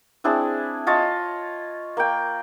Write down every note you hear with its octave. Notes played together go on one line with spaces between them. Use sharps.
C4 D4 E4 G#4
F4 C#5 D#5 A5
A#3 G5